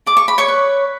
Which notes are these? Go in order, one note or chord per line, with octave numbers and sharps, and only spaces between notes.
D5 D6
C#6
B5
C#5 C#6
B4